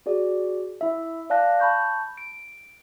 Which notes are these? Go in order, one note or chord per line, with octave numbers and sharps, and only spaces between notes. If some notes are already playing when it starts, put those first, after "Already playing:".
F#4 G#4 D5
E4 E5
D5 F5 A5 F#6 A#6
A5 B5 C#6 G6
D7